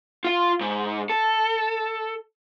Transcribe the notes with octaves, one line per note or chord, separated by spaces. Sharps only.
F4 F5
G#2
A4